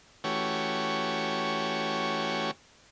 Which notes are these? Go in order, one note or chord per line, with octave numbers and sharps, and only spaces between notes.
E3 A3 C#4 F#4 G4 C#5